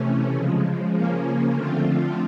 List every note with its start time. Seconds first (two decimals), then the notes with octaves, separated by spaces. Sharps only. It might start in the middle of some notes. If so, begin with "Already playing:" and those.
Already playing: C3 E3 A3 C#4
0.35 C#3 F3 G#3
0.94 C#3 F3 A#3 C#4
1.52 D3 F3 A3 C4 F4